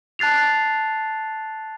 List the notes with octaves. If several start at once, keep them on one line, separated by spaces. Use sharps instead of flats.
A5 F#6 A6 C7 F7